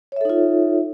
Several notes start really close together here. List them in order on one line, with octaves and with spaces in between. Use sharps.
C#5 E5 A4 D#4 F4